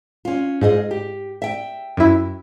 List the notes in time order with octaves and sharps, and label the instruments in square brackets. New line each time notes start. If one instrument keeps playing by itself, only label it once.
[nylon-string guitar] C#4 F4
[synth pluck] G#2 [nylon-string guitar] F4 G#4 D#5
[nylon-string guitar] G4
E5 G5
[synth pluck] F#2 E4